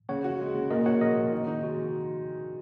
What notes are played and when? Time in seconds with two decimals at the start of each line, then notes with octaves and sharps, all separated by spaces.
0.09 C#3 C#5 F#5
0.24 F#4
0.40 G#3
0.55 C#3
0.71 A#2 A#4 D#5
0.86 F#4 C#5 F#5
1.01 G#3 A#4 D#5
1.17 A#2
1.32 D#3
1.47 D#4
1.63 G#3 F#4